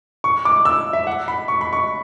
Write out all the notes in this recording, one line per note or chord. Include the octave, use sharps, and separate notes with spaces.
C#6
D6
E6
E5
F#5
B5
C#6
B5
C#6